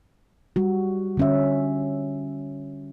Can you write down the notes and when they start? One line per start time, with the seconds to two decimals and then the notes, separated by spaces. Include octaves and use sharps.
0.56 G3 F#4
1.17 D3 C#4 E5